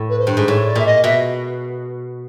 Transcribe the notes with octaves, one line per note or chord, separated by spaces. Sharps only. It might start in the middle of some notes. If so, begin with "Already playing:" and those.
Already playing: A2
B4
C5
G2
G#2
A2 C#5
D5
A#2 E5
D#5
B2 E5